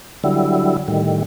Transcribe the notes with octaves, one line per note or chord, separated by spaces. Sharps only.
D3 F#3 G3 E4
A2 D#3 G3